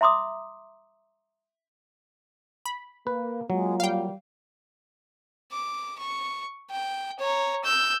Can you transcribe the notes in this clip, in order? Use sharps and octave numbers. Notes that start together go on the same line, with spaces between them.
E5 A#5 C6 D6 D#6
B5
A#3 B4
F#3 G#3 A#3 F4
G3 F5 G5
D6
C#6
G5
C#5 A#5
E6 G6